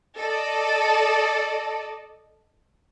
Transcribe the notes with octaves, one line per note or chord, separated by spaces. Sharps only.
A4 D5 D#5 A5